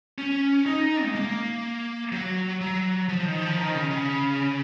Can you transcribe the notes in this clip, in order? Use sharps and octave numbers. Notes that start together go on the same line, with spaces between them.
C#4
D#4
G#3
A#3
F#3
F#3
F3
D#3
F3
D#3
C#3
C#3